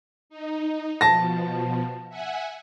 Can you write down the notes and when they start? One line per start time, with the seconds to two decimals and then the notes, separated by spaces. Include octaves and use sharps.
0.30 D#4
1.01 B2 F3 A5 A#6
2.09 E5 F#5 G#5